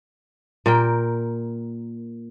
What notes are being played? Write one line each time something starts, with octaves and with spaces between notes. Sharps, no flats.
A#2 A#4 G5